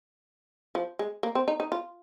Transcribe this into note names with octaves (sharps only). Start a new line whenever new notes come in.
F3
G#3
A#3
C4
D#4
D#4
F4